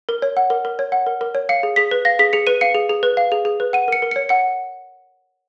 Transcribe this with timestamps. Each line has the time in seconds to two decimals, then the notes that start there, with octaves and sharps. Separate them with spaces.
0.09 A#4
0.22 C#5
0.37 F#5
0.50 A#4
0.65 A#4
0.79 C#5
0.92 F#5
1.07 A#4
1.21 A#4
1.35 C#5
1.49 F5 C#7
1.63 G#4
1.76 G#4 B6
1.91 B4
2.05 F5 A#6
2.19 G#4 B6
2.33 G#4 C#7
2.47 B4 D#7
2.61 F5 C#7
2.75 G#4
2.90 G#4
3.03 B4
3.17 F5
3.32 G#4
3.45 G#4
3.60 B4
3.73 F#5 D#7
3.88 A#4 C#7
4.02 A#4
4.11 C#7
4.16 C#5
4.29 F#5 C#7